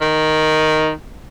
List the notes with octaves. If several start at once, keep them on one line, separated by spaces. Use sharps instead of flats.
D#3